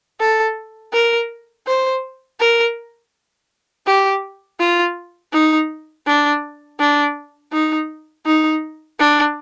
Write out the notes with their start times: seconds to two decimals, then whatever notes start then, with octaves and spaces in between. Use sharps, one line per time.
0.20 A4
0.93 A#4
1.67 C5
2.40 A#4
3.86 G4
4.60 F4
5.33 D#4
6.06 D4
6.80 D4
7.52 D#4
8.26 D#4
8.99 D4